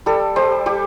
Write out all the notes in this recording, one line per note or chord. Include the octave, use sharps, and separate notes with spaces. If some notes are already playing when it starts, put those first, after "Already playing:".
G3 A4
G3 C5
G3 G4